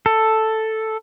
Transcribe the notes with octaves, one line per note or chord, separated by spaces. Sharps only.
A4